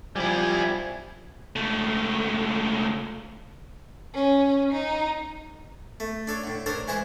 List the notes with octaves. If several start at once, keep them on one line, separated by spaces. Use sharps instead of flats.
F3 G3 E4 G#5
C#2 A3
C#4
D#4
A3
D4 A4 C#5
A2 D3
D4 A4 A#4 C5 C#5
E3 G#3 G#4 C5